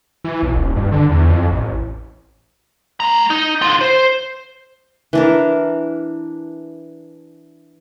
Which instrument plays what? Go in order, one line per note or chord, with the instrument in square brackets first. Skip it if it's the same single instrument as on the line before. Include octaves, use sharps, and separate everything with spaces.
[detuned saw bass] E3
B1
D#1
G2
D3
E2
F2
A1
[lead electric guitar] A3 A#5
D#4
D3 F4
C5
[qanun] E3 D4 A#4